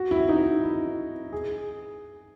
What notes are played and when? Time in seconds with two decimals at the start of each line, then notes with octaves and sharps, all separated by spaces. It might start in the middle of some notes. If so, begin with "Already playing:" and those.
Already playing: F#4
0.11 E4
0.29 D#4
0.63 E4
1.33 G#4